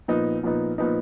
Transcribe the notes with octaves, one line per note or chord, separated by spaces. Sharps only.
A#2 F3 B3 D#4
A#2 F3 B3 D#4
A#2 F3 B3 D#4